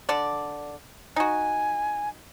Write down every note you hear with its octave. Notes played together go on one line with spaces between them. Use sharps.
D3 D5
D#4 F#4 G#5